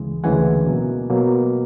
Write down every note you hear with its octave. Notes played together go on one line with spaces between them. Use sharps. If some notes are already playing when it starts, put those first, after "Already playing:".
Already playing: D2 C#3 E3 G#3
D2 C#3 E3 G#3 F#5 G#5
B2 F#3 A#3
B2 F#3 A#3